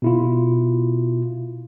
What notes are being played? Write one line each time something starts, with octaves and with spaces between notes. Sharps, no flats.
B2 E4 F4